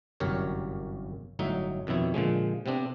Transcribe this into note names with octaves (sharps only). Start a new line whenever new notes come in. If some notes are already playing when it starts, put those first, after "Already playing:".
G1 C2 F#2 G4 A#4 C#5
G1 A2 F#3 D#4 E5
F2 B2 D#3 E4 C#5
A#2 D3 F3 G#3
C3 B3 C4 D4